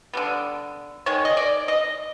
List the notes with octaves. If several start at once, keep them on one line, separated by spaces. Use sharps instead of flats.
D3 G3 B3
D#3 G#3 C#5
D#5
D5
D#5